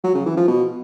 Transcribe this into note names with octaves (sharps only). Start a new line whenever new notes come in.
F#3
C#3
E3
F3
B2